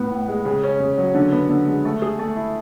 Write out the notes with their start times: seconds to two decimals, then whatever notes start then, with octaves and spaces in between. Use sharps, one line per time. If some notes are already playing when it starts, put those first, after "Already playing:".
Already playing: A2 B3
0.11 A2
0.28 G#3
0.45 C#3
0.64 C#4
0.80 C#3
0.98 F#3
1.14 D3
1.32 B3
1.49 D3
1.67 G#3
1.85 A3
2.02 G#4
2.19 A3
2.36 E4